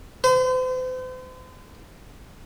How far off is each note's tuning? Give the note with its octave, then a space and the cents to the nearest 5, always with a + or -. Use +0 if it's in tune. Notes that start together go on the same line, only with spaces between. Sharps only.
C5 -40